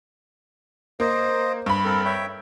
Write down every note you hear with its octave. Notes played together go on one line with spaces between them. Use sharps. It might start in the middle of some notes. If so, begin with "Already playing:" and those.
A#3 C5 D#5
G2 B5
C4 A4 A#4
C#5 E5 G5